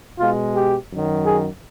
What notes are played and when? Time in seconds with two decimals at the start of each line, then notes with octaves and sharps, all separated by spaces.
0.20 B2 G#3 F4
0.56 G4
0.91 F#2 D#3 F#3
1.26 G#4